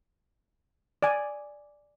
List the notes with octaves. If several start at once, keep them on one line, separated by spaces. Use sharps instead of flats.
D5 G#5